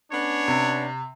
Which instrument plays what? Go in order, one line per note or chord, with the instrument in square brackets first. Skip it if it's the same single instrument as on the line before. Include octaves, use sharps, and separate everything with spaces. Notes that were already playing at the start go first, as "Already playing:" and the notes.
[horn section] B3 C#4 D4 [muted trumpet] C#5
[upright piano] C3